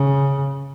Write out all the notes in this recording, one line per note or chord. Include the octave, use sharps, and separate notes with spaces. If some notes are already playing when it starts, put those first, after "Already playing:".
Already playing: C#3